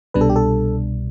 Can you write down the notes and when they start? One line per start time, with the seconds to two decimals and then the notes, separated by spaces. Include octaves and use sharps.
0.14 C2 B2 G3 D4 B4
0.21 A4
0.30 G4
0.36 A4